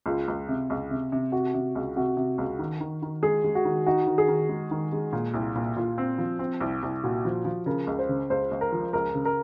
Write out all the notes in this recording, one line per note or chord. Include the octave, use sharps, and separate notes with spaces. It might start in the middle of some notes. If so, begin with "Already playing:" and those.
C#2 F4
C#2
C3
C#2
C3
C3
C3 F#4
C3
C#2
C3 F#4
C3
C#2
D#3
D#3
D#3
G#3 G#4
G#3
F#4
D#3
D#4 F#4
D#3
G#4
D#3
G#3
D#3
G#3
A#2
C2
A#2
A#2 F4
C4
F3
C4
C2
C2
A#2 F#4
F3
F3
C#3 A#4
C#2
C5
C#3
C#2 C5
C#2
A#4
F3
C#2 A#4
C#3
A#4